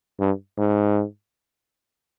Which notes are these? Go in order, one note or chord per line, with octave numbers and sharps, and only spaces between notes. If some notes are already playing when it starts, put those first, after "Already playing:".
G2
G#2